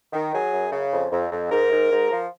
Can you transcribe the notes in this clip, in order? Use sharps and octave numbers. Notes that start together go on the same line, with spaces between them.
D#3
F#3 G#4
F#2
C#3
F2
F2
F2
G#2 A#4
G#2
G#2
F3